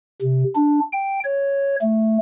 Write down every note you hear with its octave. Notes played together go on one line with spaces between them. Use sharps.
C3
D4
G5
C#5
A3